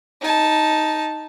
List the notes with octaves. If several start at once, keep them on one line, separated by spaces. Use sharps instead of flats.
D#4 A5